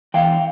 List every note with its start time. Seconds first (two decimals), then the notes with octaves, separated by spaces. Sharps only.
0.14 E3 F5 G5